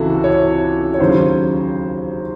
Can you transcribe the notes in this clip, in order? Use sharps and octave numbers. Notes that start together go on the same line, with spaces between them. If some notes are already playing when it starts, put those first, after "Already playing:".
Already playing: C#2 C3 E3 F#4 A4
C#5
C#5
D#2 C#3 F#3 C5